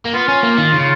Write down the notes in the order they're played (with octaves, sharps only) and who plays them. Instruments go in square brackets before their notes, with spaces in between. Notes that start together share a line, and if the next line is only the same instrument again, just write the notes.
[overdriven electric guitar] A#3
[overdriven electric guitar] B3 [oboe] F4
[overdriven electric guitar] C#4
A#3
D#3
C#3